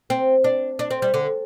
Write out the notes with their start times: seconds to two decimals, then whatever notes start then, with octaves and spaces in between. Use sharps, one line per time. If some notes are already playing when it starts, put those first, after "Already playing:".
0.10 C4
0.44 D4
0.79 D4
0.91 C4
1.02 G3
1.14 D3